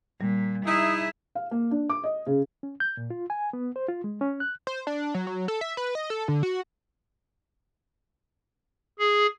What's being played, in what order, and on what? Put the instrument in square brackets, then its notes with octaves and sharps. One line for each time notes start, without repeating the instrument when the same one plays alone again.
[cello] A#2 [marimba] G3
[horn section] D#4 E4 [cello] G#4 E5 [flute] D#6
[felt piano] F5
A#3
D4
D6
D#5
C#3
[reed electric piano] C#4
G6
A#2
F4
G#5
B3
C5
F4
G#3
C#4
F#6
[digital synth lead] C5
D4
F#3
F#3
A4
E5
B4
D#5
A4
D3
F#4
[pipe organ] G#4